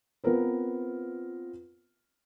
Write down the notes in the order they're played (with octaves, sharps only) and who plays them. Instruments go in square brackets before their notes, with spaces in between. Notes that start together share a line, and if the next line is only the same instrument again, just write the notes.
[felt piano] B3 C4 F4 A#4 B4